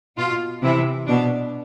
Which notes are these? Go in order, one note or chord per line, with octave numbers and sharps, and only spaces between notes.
B2 F4
C3 E3 E4
B2 D4